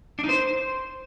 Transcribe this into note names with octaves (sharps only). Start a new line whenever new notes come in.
D4
D#4
C5